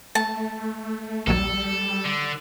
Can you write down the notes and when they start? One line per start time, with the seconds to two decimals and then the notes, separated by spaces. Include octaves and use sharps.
0.15 A3 A5
1.27 A#1 D#2 F#3 G3 A4
2.05 D3